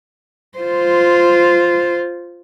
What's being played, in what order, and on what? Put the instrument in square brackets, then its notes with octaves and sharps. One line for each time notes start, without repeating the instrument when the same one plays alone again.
[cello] F4 C5